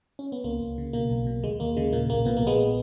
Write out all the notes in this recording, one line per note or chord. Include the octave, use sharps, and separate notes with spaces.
C#4
B3
C#2 A#3
C#2
C#3
B2 A#3
B1
B2
D#2 G#3
D#2 A#3
C#3 G#3
A#2 A#3
B1 A#3
A#2 B3
A#3
A#1 G#3 B3